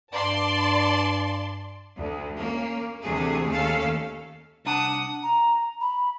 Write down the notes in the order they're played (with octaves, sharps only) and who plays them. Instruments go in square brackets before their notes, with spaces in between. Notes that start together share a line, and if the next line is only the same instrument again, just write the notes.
[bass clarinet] G2 [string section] D5 A5 C6
[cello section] D2
A#3 C#4
D2 C3 E3 A3 G#4
D#2 A3 C#4 A4 F5
[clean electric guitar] C2 D4 A5 [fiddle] F#5 D#6
[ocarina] A#5
B5